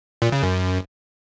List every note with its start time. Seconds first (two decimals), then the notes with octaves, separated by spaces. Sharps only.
0.22 A#2
0.32 C#3
0.43 F#2